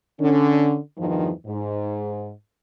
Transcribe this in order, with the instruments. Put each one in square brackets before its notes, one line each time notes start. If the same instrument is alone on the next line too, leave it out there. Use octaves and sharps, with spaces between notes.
[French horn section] D3 C#4
E2 G2 D#3 F3
G#2